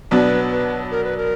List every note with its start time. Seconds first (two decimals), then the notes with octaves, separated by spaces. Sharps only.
0.11 B2 F#3 B3 D4 B4
0.51 B4
0.91 A#4
1.04 B4
1.17 A#4